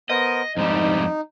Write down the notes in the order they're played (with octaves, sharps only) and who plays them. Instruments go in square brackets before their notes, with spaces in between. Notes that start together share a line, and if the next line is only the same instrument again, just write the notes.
[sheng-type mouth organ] B3 A#4 C5 [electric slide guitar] D#5
[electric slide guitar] F2 G#2 G3 [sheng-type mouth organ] D#4